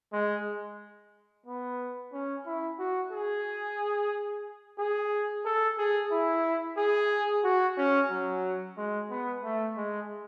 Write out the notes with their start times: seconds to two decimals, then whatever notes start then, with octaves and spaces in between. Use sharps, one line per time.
0.13 G#3
1.47 B3
2.13 C#4
2.46 E4
2.79 F#4
3.13 G#4
4.79 G#4
5.45 A4
5.78 G#4
6.12 E4
6.78 G#4
7.44 F#4
7.78 C#4
8.11 F#3
8.78 G#3
9.11 B3
9.44 A3
9.77 G#3